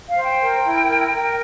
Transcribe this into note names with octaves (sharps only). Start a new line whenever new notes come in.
F5
C5
G5
A#4
E4
A#4
A#4